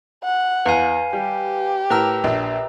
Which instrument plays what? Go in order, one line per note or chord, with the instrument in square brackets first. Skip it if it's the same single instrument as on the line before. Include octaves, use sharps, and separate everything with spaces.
[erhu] F#5
[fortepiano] E2 [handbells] B4 F5 G#5
[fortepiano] G3 [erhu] G4
[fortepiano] A2 A#4 [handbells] B4 A#5 E6
[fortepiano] A#1 D4